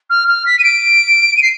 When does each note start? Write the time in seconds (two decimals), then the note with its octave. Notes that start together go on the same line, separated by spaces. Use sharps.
0.10 F6
0.28 F6
0.46 B6
0.58 D#7
0.64 D7
1.36 D#7
1.42 C7